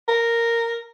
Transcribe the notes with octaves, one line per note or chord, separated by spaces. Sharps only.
A#4